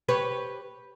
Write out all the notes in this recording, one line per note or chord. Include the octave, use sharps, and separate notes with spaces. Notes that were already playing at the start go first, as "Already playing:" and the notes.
G4 B4 C#5